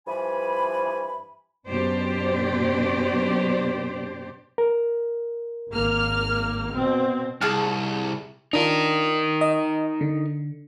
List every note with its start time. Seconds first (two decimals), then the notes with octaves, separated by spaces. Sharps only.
0.07 G2 E3 F3 G#5 B5
1.66 F#2 B2 D4 G4 C5 D5
4.58 A#4
5.70 G#1 A#3 F6
6.72 B2 C4
7.41 C2 G#4 A5 F6
8.53 D4 D#4 F4 A#4
9.41 D#5
10.01 D3